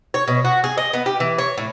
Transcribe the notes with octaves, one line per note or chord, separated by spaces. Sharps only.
C#5
B2
F#4
G#4
D#5
B3
G4
E3
C#5
A2